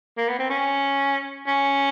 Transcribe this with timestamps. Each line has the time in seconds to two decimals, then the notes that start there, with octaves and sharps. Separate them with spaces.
0.17 A#3
0.29 B3
0.39 C4
0.50 C#4
1.47 C#4